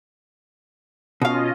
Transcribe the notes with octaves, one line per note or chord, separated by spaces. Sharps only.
B2 C#4 F4 D#5 F5